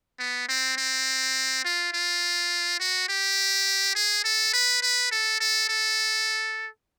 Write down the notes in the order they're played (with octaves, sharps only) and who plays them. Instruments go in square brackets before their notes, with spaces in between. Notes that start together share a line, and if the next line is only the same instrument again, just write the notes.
[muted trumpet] B3
C4
C4
F4
F4
F#4
G4
G#4
A4
B4
B4
A4
A4
A4